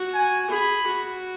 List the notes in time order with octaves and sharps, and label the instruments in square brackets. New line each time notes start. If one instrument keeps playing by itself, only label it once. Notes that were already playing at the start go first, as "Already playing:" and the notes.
Already playing: [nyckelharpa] F#4
[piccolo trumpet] G#5
[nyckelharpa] G#4 [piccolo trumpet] B5
[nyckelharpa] F#4